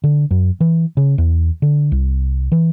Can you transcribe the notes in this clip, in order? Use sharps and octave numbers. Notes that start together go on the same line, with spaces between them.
D3
F#2
E3
C#3
E2
D3
C2
E3